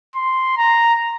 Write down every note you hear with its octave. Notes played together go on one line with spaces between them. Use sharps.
C6
A#5